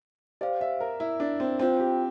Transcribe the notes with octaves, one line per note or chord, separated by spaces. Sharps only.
G4 C5 D5 F5
E5
A#4
E4
D4
C4
C4 F4 C5 G5
G4